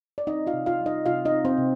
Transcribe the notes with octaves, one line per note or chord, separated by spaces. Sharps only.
D5
C4 D#4 D#5
F4 F5
C3
F4 F5
G3
D#4 D#5
C3 F4 F5
D#4 D#5
C4
C4 C5
C3